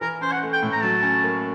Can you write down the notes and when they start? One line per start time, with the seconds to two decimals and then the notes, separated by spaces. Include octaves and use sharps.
0.01 E3 A#4
0.21 C#4 C5
0.31 F#5
0.42 A3
0.53 G5
0.63 A2
0.72 A#5
0.83 F#3 A5
1.03 C#4
1.24 A#3